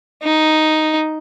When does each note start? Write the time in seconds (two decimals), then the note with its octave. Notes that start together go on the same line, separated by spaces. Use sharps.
0.23 D#4